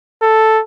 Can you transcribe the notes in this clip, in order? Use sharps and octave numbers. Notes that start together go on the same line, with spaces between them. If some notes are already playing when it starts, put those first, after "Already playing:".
A4